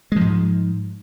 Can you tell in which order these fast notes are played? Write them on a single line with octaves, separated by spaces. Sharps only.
G#3 F3 G#2